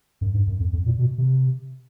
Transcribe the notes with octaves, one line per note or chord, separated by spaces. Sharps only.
F#2
G2
F#2
F2
F2
A#2
B2
C3